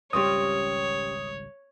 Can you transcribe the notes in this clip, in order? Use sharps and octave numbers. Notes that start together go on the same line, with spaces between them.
G#1 C#2 G3 C4 C#4 G4 C#5 D#6